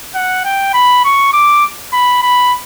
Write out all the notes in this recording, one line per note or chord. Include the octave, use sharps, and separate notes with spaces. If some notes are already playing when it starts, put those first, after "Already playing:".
F#5
G5
B5
C#6
D6
B5
B5